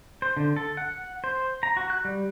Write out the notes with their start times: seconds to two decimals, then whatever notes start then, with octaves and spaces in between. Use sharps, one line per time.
0.22 C5
0.37 D3
0.56 A4
0.77 F#5
1.24 C5
1.63 A#5
1.77 F#4
1.90 F#6
2.05 G3